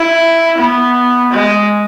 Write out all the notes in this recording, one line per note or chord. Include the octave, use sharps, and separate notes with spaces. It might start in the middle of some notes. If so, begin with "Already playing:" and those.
Already playing: E4
B3
G#3